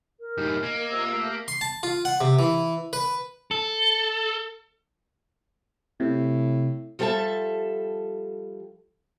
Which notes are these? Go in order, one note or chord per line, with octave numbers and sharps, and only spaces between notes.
A#4
F#2 A2 D#4 G4
A#3 D#5 G#6
C3 F4 E6
A3 G4 A#4
C6
A5
F4
F#5
C3
E3
B4
A4
A2 C3
F3 G3 A4 B4 E5 A5